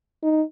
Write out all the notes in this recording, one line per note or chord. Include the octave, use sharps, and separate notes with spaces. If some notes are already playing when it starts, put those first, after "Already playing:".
D#4